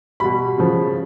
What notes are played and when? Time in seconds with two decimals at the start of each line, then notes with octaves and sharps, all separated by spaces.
0.20 B2 G3 B5
0.58 C#3 F3